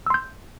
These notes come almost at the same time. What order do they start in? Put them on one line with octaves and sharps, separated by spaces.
E6 C6 G6